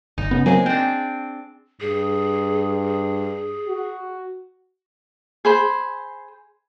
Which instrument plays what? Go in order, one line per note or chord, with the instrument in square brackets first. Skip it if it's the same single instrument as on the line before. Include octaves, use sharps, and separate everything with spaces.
[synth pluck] G1 [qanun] D#4
[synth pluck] C#3 B3
[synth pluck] F#3 A#3 C4 [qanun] G#3 G#4
[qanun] C4 D4 [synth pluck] G5
[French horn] G2 [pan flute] G#4
[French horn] F#4
[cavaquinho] G#4 C5 B5